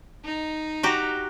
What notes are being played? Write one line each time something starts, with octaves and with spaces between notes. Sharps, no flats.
D#4
F#4 G4 A#5